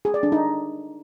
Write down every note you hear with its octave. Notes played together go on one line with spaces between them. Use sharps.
G#4
D5
D4
D#4